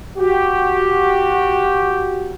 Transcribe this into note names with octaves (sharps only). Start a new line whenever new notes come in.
F#4 G4